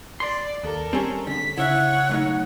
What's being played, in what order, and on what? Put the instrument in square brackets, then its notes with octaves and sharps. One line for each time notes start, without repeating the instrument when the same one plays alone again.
[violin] D5 [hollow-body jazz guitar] C6
[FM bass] D#2 [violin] A4 A#4
[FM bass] G3 [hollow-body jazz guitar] C4 C#4 G#4
[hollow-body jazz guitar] D3 [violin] B6
[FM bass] C#3 [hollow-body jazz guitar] E4 E5 [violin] C#5 [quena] F#5
[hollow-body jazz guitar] B1 A3 D#4